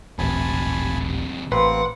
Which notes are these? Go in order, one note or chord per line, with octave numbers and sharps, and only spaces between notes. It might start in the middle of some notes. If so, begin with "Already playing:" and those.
D#1 A1 D#2 C3 G#5 A5 B5
A1 A#3 C4 B4 F#5 C6